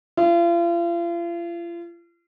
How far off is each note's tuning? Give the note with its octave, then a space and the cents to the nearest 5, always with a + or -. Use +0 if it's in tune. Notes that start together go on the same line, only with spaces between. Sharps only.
F4 -40